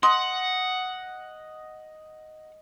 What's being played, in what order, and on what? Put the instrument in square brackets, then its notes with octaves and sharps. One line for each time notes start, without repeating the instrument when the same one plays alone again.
[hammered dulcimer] D#5 [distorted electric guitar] F#5 [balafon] C6